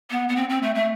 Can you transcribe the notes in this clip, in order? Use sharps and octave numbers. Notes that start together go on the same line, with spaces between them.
B3
B3
C4
C4
A3
A3